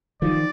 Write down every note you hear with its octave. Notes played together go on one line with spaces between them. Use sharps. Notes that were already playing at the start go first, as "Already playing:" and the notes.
D#3 F3 D5